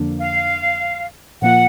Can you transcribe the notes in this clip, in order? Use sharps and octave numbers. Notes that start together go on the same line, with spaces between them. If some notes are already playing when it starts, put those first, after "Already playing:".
Already playing: F2 D3 F3 A#3 D4
F5
A#2 F3 A#3 F4 F#5